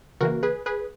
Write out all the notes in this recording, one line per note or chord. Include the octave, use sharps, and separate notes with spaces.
C#3 E3 A#3 F#4 A#4
G#4 B4
G#4 B4